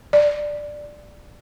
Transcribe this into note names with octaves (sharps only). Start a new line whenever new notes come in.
D5